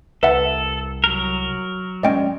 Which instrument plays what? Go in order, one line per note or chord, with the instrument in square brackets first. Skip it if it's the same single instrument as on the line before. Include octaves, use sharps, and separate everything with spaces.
[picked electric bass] C2 [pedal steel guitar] A4 [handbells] B4 E5 F#5
[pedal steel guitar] F#3 A#4
[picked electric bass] D1 G#3 C#4 [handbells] D5 D#5 G5